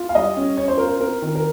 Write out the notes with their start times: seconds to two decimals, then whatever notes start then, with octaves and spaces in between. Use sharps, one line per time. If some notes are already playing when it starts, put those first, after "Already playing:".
Already playing: F4
0.09 F5
0.15 G3 D#5
0.37 C#4
0.57 C#4 C#5
0.68 C5
0.78 F4 A#4
0.88 C5
1.00 C4 A#4
1.22 D#3
1.35 A#4